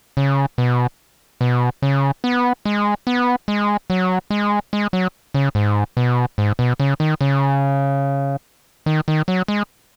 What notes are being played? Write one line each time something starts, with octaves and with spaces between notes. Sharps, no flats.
C#3
B2
B2
C#3
B3
G#3
B3
G#3
F#3
G#3
G#3
F#3
C#3
G#2
B2
G#2
B2
C#3
D#3
C#3
D#3
D#3
F#3
G#3